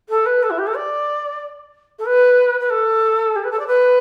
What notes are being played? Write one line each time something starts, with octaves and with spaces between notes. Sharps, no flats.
A4
B4
A4
E4
G4
A4
D5
A4
B4
B4
A4
G4
B4
A4
D5
B4